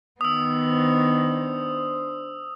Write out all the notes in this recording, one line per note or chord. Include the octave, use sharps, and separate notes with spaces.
D#3 B3 D#6 E6
D4 C5